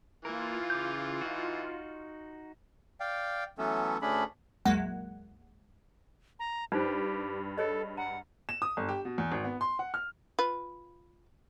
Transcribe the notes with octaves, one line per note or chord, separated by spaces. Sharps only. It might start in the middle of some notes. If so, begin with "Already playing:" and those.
E3 A#3 F4 A#4
C#3 D6 G6
D#4 F#4
D5 F5 G5
E3 F#3 A3 B3 C#4 A4
D2 A3 C#4 D4 G#4 B5
A#1 E2 F#3 G#3 A#3 F#5
A#5
G2 D#4 F4 G4 C5
G#4 A4 C#5 D#5
F#5 A#5
E7
D#6
G1
G4
B2
E2
G#1
B3
C6
F#5
F6
F4 B4